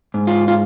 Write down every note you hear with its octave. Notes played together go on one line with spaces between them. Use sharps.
G#2
F4
F4